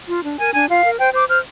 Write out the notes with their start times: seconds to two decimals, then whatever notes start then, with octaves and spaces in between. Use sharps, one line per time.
0.09 F4
0.24 D4
0.38 A#4 G#5
0.53 D4 G#5
0.68 F4 F5
0.84 A#4
0.98 C5 G5
1.13 C5 D6
1.28 C5 F6